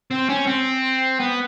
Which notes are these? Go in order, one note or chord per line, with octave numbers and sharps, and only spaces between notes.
C4
C#4
C4
B3